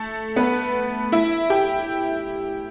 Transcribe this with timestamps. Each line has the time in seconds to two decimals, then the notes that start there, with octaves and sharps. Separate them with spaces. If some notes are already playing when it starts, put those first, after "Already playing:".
Already playing: A3 A4
0.36 B3 B4
1.12 E4 E5
1.50 G4 G5